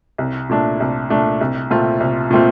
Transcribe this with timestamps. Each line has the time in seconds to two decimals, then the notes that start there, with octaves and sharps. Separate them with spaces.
0.18 C2
0.49 A#2 A3 D4
0.80 C2
1.10 A#2 A3 D4
1.41 C2
1.70 A#2 A3 C4 F4
2.00 C2
2.31 A#2 A3 C4 F4